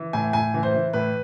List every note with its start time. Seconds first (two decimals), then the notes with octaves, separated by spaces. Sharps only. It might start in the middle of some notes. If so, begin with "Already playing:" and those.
Already playing: E3
0.13 A2 G#5
0.33 A2 G#5
0.54 E3
0.63 C5
0.74 E3
0.93 A2 B4